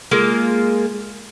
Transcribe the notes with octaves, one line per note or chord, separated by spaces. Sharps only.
G#3 A#3 F4